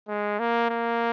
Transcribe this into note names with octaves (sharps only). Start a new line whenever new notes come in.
G#3
A#3
A#3